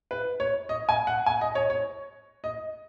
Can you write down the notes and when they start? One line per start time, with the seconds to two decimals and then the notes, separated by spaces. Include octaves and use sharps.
0.11 B4
0.40 C#5
0.69 D#5
0.89 G#5
1.07 F#5
1.26 G#5
1.41 D#5
1.55 C#5
1.70 C#5
2.44 D#5